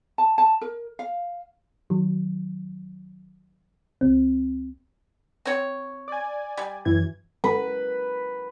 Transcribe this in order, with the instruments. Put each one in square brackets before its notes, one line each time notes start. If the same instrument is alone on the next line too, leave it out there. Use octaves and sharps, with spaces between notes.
[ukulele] A5
A5
A#4
F5
[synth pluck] D#3 F#3
C#2 C4
[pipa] C4 C#5
[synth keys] D5 G#5
[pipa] G3
[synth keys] F#2 E3 G#6
[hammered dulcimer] B4